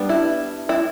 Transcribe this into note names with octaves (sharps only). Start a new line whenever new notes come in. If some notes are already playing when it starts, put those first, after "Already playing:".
Already playing: G3 B3 D4
E4
E4